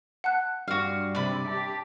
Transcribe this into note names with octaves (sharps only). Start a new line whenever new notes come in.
F#5 A5 F#6
G2 G3 D4 F#4 F5
C3 D5 B5
G4 A5